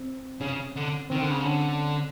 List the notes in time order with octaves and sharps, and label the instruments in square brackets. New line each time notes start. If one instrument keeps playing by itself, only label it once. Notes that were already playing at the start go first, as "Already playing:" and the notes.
Already playing: [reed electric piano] C4
[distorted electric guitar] C#3 [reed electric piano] C#4
[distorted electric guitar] D3
[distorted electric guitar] D#3 [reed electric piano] C4
[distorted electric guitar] D3
C#3
[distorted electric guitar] D3 [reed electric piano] C#4